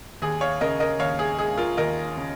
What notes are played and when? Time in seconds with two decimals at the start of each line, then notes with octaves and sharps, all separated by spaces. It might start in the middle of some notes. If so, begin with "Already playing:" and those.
0.22 D#2 G#4
0.41 C#5 F5
0.61 C#3 A#4 D#5
0.80 A#4 D#5
1.00 D#2 C#5 F5
1.19 G#4
1.38 G#3 G#4
1.57 F4 A#4
1.77 D#2 A#4 D#5
2.17 C#3